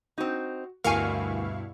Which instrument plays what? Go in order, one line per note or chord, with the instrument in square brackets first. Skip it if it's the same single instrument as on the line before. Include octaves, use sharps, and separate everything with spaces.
[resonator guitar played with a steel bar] C4 D#4 [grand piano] F#4
[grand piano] D2 [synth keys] G2 B2 E4 [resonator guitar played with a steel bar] A#4 G#5 [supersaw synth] F5 C#6